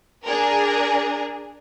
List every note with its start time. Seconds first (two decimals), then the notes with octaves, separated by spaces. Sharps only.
0.24 D4 G#4 A#4